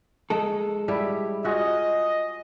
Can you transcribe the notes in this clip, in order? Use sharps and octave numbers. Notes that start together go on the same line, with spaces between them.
G#3 A4
G3 E4
F4 F#4 G#4 D#5